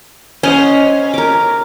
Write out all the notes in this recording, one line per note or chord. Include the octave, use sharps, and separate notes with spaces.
C#4 C5 D#5 F#5
A#4 D6